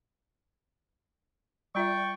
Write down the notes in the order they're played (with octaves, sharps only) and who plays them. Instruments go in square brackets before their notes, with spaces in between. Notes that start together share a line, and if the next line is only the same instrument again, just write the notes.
[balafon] G3 F4 E5 [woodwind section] D5 G5 C#6